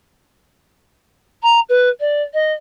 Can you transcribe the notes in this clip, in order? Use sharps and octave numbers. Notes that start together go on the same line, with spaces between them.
A#5
B4
D5
D#5